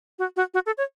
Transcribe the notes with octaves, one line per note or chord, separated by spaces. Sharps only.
F#4
F#4
F#4
A4
C#5